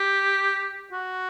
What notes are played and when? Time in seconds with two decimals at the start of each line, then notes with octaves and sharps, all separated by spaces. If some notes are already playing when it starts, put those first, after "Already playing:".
Already playing: G4
0.93 F#4